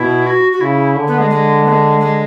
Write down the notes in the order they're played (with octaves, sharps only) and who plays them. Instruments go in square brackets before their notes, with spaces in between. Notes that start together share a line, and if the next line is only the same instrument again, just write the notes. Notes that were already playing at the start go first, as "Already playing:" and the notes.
Already playing: [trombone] B2 [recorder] E4
[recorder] F#4
F#4
[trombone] C#3 [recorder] E4
[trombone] D3
[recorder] B3
G#3
G#3
B3
G#3
G#3